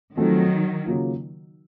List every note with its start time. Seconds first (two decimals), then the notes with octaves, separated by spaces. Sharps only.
0.16 D#3 F3 F#3 A3 C4 F#4 A4
0.86 C#3 F#3 A#3 F4